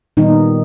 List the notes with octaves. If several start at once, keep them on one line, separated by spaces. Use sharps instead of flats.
A#2 D#3 G3 B3 D#4